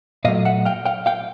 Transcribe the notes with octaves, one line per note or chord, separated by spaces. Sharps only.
A#2 F#3 A3 D#5 F5
E5 F#5
F5 G5
F5 G5
F5 G5